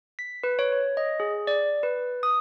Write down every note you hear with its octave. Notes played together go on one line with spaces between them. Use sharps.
B6
B4
C#5
C#5
D#5
G#4
D5
B4
D#6